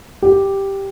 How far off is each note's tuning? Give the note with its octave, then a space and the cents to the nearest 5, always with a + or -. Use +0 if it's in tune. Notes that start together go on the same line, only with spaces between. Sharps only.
G4 +0